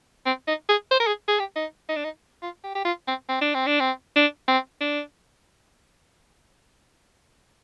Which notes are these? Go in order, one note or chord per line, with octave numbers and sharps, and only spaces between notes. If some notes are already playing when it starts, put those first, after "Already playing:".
C4
D#4
G#4
C5
A#4
G#4
G#4
G4
D#4
D#4
D4
D#4
F4
G4
G4
F4
C4
C4
D4
C4
D4
C4
D4
C4
D4